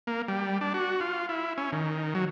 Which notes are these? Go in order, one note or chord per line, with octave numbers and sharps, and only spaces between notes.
A#3
G3
D4
F#4
F4
E4
C#4
D#3
F#3